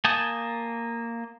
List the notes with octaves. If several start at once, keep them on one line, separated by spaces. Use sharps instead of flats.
A#3 G#5 A5 D#6 G6